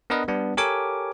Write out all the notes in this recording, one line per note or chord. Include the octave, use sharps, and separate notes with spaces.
B3 D4 A#4 B4 D#5
G3 B3 D4
G4 A4 A#4 C#5 G#5 D6